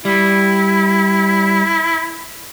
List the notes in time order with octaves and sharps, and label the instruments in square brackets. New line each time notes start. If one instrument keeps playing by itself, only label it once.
[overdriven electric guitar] G3 [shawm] E4